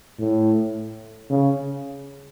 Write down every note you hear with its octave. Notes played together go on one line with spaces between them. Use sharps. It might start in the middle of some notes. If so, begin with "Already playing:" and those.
A2
C#3